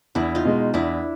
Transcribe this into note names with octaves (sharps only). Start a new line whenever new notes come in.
E2 D4 E4
D#4 F4
B2 G#3
E2 D4 E4